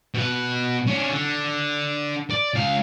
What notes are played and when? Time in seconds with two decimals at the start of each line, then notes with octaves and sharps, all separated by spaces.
0.14 B2 B4
0.87 C#4 D4
1.10 D3
2.30 D5
2.54 C#2 F5